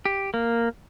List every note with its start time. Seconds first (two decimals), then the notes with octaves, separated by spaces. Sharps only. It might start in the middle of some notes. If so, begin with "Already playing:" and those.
0.05 G4
0.34 A#3